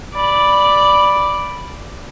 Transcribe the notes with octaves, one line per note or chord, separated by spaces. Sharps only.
D5 B5